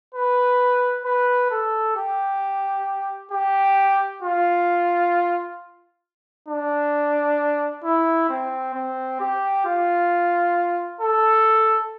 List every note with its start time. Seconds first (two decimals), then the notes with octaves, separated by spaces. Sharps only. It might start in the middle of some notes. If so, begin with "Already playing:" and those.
0.15 B4
1.05 B4
1.51 A4
1.96 G4
3.32 G4
4.22 F4
6.48 D4
7.84 E4
8.29 C4
8.75 C4
9.20 G4
9.65 F4
11.01 A4